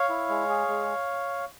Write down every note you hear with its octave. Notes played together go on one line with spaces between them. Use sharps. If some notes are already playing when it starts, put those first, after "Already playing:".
Already playing: C#5 F5
E4
G#3
G#4
G#3